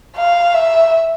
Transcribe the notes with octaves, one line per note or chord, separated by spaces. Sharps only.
F5
E5